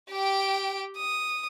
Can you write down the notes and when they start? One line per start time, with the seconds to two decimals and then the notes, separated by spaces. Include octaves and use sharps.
0.11 G4 G5
0.97 D#6